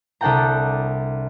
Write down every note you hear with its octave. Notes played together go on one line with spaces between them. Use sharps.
C2 D4 A4 F#5 G5 A#5